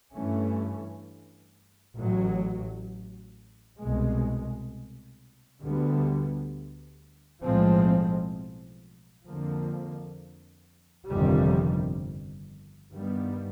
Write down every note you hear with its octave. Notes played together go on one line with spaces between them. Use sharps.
G2 E3 A3 C#4
A1 A2 F#3
C2 B2 G#3
D2 D3 G3 B3
B1 A2 F3 G#3 C4
F2 D3 F3 A#3
G1 F2 C3 D#3 G3
G2 D#3 G3 B3